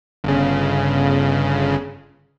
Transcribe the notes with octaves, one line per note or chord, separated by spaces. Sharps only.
G1 C#3